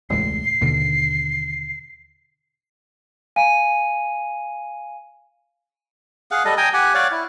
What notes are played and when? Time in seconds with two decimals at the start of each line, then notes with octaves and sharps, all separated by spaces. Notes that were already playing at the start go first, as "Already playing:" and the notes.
0.10 E1 C#2 A2 C7
0.61 D#2 B2 D3
3.36 F5 G#5 D#7
6.31 G#4 F5 F#5
6.45 G3 A4 D#5
6.57 G5 G#5 A#5 D#6
6.74 G4 F#5 G#5
6.94 C#5 D5 F5 F#5
7.11 E4